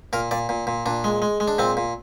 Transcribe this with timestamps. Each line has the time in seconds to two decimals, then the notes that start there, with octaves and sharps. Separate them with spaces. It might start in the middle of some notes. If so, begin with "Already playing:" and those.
0.13 A#2 A#4
0.31 A#2 D5
0.49 A#2
0.67 A#2
0.86 A#2 D4
1.04 G#3
1.22 G#3
1.40 G#3
1.48 D4
1.58 A#2 C4
1.77 A#2